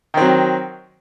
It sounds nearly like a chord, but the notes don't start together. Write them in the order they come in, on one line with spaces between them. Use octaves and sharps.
D#3 C4 F#3